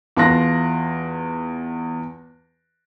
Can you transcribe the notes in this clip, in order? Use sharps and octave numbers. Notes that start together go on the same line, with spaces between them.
E2 F4 A5 C6 F#6 A#6